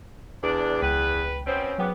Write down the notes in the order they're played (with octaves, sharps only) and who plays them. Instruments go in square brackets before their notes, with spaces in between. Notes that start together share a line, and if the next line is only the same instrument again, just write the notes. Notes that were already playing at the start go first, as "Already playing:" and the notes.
[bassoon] E2 [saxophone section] D4
[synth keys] C#2 G5 [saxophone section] B4
[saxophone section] B2 C4 [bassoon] C#4
[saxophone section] G#2 B3 [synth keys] F#3 G5 D6